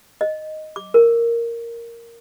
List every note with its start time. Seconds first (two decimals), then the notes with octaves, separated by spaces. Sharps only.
0.21 D#5
0.76 D6
0.94 A#4